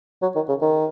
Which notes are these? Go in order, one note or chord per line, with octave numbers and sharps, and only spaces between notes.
F#3
D#3
C#3
D#3